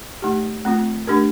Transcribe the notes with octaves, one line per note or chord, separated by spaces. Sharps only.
A3 D#4 G4
A3 C4 F4
A3 D4 G4 A#4